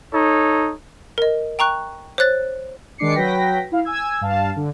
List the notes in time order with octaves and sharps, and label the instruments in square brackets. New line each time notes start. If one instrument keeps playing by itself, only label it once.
[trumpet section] D#4 A4 C#5
[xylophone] A#4 D#5
G5 A#5 C#6 F#6
C5 C#5 F#6 A6
[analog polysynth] D#3 G#3 D4 D6 C7 C#7
F#3 B4 G5 A#6 B6
E4 F5
G#5 E6 G#6
G2 F5 A5
D3